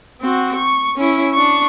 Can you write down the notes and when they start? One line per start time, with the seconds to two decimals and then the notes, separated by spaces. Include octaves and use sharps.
0.20 C4 F#4
0.55 C#6
0.96 C#4 E4
1.33 D4 C#6